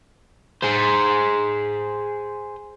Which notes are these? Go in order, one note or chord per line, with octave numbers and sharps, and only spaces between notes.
G#4 C5